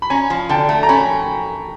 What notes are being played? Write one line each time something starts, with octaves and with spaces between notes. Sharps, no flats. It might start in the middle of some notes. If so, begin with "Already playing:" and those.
B5
C#4 G#5 A#5
F3
D3 G5 A5
A3
A#5
C#4 A5 B5